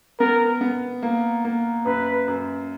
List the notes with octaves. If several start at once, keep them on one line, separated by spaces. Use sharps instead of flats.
B3 A#4
B3
A#3
A#3
F#2 B4
F#2